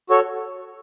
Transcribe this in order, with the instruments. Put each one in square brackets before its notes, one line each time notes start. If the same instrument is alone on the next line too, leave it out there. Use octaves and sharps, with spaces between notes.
[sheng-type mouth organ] F#4 A4 C#5